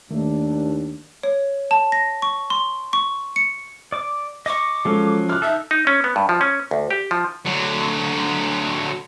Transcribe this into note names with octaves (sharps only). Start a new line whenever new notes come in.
D#2 D#3 A3 A#3 D4
C#5
A5
A#6
C#6
C6
C#6
C#7
D5 D6
D#5 C#6 D6
F3 F#3 G#3 C#4 A4
D6 F6 F#6
D#4 A4 E5
D#4
C#4
B3
G2
F3
C#4
D2
G4
F3
D3 F#3